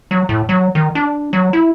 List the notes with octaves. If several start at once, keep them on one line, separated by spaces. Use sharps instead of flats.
F#3
A2
F#3
D#3
D4
F#3
E4